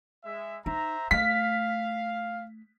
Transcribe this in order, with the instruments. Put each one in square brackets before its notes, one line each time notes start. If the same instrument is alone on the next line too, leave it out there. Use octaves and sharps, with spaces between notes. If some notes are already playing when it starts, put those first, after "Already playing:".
[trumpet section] G#3 E5
[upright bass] D#4 [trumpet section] C5 E5 A#5
[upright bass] A3 [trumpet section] F5 [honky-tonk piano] B6